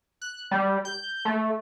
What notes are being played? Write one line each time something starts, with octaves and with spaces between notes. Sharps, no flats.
F#6
G3
G6
A3